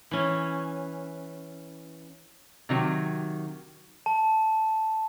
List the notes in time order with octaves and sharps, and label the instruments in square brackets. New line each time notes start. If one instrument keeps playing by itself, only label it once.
[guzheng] E3 C#4
[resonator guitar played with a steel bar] C3 D#3 F#3
[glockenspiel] A5